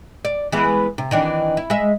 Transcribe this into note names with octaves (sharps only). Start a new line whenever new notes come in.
D5
E3 G#3 B3
C3
D#3 E3 D4
E4
G#3 E5